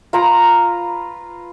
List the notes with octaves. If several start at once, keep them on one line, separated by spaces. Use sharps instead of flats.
F4 B4 A#5